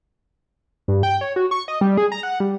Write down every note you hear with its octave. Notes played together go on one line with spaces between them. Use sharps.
G2
G5
C#5
F#4
C#6
D#5
G3
G#4
A#5
F#5
G3